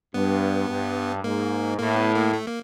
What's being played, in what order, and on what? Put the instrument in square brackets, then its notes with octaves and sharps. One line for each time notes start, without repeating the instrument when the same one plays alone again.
[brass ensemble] G2 [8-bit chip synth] B3
[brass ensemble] G2
[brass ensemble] G#2 [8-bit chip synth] A#3
[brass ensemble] A2 [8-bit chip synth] A#3
[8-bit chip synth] B3
A#3
A3
A#3